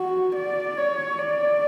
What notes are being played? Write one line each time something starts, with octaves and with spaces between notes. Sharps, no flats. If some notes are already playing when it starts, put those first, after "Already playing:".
Already playing: F#4
D5
C#5
D5